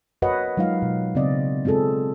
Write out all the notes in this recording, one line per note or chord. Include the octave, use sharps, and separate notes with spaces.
F#4 A#4 B4 C#5 D#5 F#5
F#3 G#3 D#4 F4 F5
B2
C#3 B3 C4 D5 D#5
G#3 C4 F4 G#4 A4